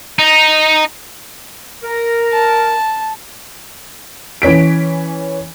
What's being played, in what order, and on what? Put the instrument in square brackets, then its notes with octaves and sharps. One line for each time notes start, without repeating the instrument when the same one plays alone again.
[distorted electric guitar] D#4
[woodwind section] A#4
[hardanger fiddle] A5
[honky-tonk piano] E3 C#4 B6 D7